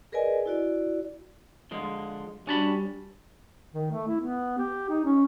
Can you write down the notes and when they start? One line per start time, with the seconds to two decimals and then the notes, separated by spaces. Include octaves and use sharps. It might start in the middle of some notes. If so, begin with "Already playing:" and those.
0.12 G#4 A#4 B4 D5 D#5 G#5
0.46 E4 F#4 D5
1.71 D3 F3 G#3
2.47 G3 C#4 D4 F#4 A5 B5
3.74 D#3
3.91 A3
4.08 E4
4.21 B3
4.58 G4
4.89 D#4
5.05 C#4